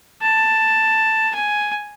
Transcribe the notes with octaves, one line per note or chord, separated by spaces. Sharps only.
A5
G#5